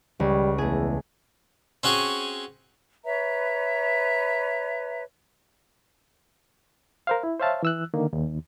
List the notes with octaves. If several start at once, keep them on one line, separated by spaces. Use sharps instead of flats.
C#2 G3
E2 A3 G#4
C4 C#4 F#4 G#4
B4 C#5 E5 A#5
A#4 C5 F5
E4
C5 C#5 E5 F5 A5
E3 E6 F#6
D3 D#3 A#3
D#2